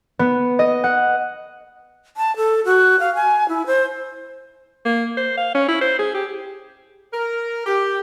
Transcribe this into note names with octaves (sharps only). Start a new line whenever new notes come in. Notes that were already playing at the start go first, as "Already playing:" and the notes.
B3
D#5
F#5
A5
A4
F#4
F5
G#5
E4
C5
A#3
C5
F5
C#4
E4
C5
G#4
G4
A#4
G4